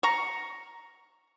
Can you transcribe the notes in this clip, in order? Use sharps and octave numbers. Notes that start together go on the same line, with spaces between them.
A#5 C#6